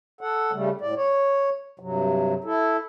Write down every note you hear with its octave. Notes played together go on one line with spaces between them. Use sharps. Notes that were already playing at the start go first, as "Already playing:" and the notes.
A4 F#5
C#3 G3 A3
A2 D5
C#5
G2 C3 F#3
E4 A4